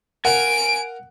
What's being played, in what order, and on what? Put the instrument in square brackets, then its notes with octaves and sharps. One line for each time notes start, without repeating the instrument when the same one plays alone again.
[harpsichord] A#4 F5 A#5 [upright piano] F#5 [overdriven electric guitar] G#5 [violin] D7